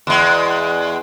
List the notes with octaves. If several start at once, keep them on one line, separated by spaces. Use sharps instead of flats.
E2 G#3